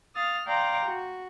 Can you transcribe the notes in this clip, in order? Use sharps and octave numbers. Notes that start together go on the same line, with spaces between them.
F5 D#6 F6 A6
D5 F5 G5 A#5 C6 D6
F#4